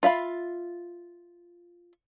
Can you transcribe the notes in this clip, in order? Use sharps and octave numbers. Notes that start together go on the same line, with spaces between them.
F4 E5 F5 B5